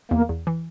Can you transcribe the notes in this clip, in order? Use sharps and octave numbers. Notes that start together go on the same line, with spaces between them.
E2 A#3
E2
E3